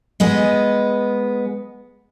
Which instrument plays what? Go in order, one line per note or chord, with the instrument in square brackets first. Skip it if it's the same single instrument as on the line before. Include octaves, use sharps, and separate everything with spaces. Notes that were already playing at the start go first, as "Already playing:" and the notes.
[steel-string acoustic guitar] G#3 B3 D#5